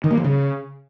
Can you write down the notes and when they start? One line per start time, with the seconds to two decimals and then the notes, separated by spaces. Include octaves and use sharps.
0.04 D#3
0.11 A#3
0.17 F3
0.24 C#3